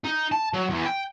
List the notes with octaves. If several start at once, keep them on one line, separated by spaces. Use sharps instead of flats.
D#4
A5
F#3
E2
G5